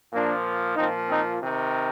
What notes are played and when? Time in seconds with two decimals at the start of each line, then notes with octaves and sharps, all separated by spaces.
0.12 A#2 F3 A#3 D4
0.76 A#2 F3 C4 D#4
1.09 C4 D#4
1.40 C3 D#3